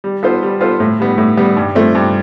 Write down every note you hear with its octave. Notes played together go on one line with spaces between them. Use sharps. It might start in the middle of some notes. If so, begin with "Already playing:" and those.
G3
B3 F4 A4 C5
G3
B3 F4 A4 C5
A2
G3 B3
A2
G3 B3
G2
F3 A3 C4
G2